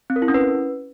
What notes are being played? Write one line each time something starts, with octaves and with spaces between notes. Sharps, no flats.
C4
A#4
E4
C#4
B4